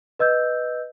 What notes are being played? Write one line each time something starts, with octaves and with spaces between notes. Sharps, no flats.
B4 D#5 E6 G6